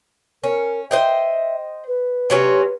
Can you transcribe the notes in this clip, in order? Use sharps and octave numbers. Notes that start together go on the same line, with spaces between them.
C#4 A#4
C5 D#5 E5 G5
B4
C3 F#3 C#4